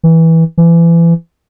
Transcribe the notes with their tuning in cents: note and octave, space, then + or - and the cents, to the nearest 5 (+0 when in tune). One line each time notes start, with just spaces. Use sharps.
E3 -15
E3 +30